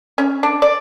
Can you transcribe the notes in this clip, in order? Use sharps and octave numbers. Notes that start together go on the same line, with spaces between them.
C#4
D4
D5